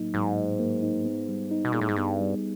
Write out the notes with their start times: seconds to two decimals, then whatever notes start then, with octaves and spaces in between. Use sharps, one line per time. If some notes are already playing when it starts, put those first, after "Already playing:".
Already playing: A2 F#3 A#3 D#4
0.14 G#2 F#3
0.37 A2
0.60 A#3
0.83 D#4
1.05 B3
1.28 G3
1.51 D#4
1.65 B2
1.72 A#2 G#4
1.81 A2
1.89 G#2
1.96 G2 B3
2.20 G3